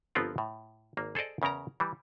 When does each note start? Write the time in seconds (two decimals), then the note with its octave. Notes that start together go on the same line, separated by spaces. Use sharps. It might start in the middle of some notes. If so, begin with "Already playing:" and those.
0.15 G1 F3 B3 C4 F4 A#4
0.38 A2
0.97 G#1 A#3
1.15 G#4 A4 C5 D5 D#5
1.42 E2 C#3 C#4 A#4 A#5
1.80 E3 G3